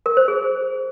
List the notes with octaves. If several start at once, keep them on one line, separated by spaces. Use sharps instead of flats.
A#4
C5
G#4